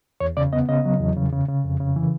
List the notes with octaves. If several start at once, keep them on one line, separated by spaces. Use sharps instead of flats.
E2 C#5
C#3 D5
B3 D#5
C#3 D#5
F#3
E2
C#3
C#3
C#3
F2
C#3
E3